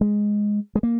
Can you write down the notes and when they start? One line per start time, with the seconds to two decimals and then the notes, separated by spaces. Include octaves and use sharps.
0.01 G#3
0.75 G#3
0.83 A#3